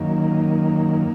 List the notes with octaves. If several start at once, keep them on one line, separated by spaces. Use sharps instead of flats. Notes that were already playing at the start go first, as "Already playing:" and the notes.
Already playing: F#2 D#3 A#3